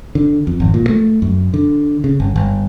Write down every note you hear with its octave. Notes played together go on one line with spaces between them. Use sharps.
D3
F2
G#1
A#2
A3
F#2
D3
C#3
G1
G1